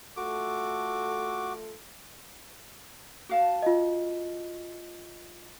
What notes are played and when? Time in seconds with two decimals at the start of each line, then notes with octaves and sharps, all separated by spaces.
0.17 A3 F4 F#4 A4 D6
3.29 F#4 F5 A5
3.63 F4 D#5